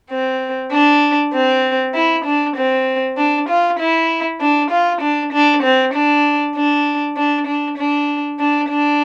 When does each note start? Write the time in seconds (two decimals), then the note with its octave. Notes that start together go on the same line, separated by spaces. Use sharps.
0.11 C4
0.72 D4
1.33 C4
1.94 E4
2.25 D4
2.56 C4
3.17 D4
3.49 F4
3.79 E4
4.41 D4
4.71 F4
5.01 D4
5.33 D4
5.63 C4
5.94 D4
6.56 D4
7.17 D4
7.47 D4
7.78 D4
8.39 D4
8.69 D4